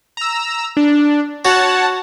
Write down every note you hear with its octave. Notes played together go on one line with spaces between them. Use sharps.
A#5 E6
D4
F#4 C#5 F#5 A5